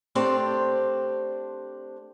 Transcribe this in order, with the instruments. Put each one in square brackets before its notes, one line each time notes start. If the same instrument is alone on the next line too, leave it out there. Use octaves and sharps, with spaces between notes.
[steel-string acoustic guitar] A3 C4 D4 G4 C5 D5